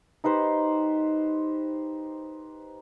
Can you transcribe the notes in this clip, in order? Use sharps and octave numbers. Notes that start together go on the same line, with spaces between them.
D#4 G4 B4 C5